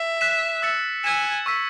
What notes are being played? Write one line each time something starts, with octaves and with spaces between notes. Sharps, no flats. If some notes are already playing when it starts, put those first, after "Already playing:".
Already playing: E5
F#6 B6 E7
E6 A6 C#7
G#5 E6 G#6 B6 E7
C#6 E6 B6